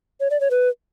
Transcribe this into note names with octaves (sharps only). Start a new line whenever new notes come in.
C#5
D5
C#5
B4